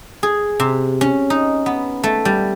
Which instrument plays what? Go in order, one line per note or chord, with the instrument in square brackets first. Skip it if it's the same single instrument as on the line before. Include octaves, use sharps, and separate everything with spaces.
[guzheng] G#4
C3
C#4
D#4
B3
A3
G3